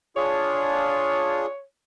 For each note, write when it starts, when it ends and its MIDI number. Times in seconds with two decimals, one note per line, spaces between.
0.16 1.46 62
0.16 1.46 65
0.16 1.46 68
0.16 1.62 73